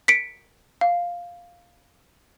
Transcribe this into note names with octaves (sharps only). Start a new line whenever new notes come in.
B6 C#7 D7
F5